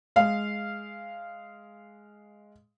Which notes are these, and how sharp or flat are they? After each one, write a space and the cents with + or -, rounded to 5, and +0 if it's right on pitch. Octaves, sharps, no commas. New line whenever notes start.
G#3 +0 F5 -10